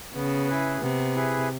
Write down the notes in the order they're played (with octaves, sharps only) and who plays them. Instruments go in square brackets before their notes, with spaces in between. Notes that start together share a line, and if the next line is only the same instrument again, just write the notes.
[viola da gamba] C#3 [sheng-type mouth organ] B3
[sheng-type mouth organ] E4 G#4 B4
[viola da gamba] C3 [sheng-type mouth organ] B3
[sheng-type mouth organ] E4 G#4 B4